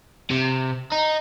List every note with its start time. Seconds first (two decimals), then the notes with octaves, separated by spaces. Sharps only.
0.31 C3
0.92 D#4